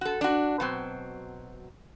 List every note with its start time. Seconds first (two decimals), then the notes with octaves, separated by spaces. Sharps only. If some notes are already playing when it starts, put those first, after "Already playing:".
0.01 F#4 A4
0.21 D4 F#4
0.60 B2 F#3 C4